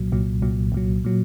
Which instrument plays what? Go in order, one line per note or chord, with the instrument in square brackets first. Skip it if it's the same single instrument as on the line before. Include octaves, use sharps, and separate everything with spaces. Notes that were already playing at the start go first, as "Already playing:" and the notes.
Already playing: [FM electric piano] C2 A#2 F#3
C2 A#2 F#3
C2 A#2 F#3
C2 A#2 F#3
A#2 F#3